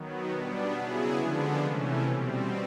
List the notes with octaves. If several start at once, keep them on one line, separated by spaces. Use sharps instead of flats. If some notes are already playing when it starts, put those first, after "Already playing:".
Already playing: D#3 F#3 B3
B2 G3 B3 D4
C#3 F#3 B3 E4 G#4
D3 F3 G#3 B3 D4
C3 E3 A3 C#4
B2 G3 C4